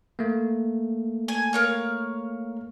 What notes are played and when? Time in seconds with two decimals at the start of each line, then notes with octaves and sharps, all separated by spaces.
0.19 A3 A#3
1.28 G#5
1.53 A#4 C#5 F5